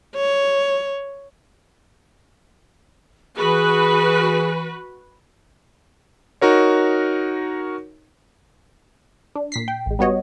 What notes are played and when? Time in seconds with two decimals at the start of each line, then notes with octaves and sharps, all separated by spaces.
0.15 C#5
3.37 E3 F#4 G#4 B4
6.41 D#4 F#4 A#4 C#5
9.35 D4
9.52 A#2 B6 C7
9.68 G5
9.86 A1 G#3
9.99 G3 B3 F#4 C#5 D#5